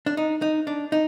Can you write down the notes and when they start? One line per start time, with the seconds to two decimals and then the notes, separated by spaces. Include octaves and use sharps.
0.06 D4
0.17 D#4
0.42 D#4
0.67 D4
0.92 D#4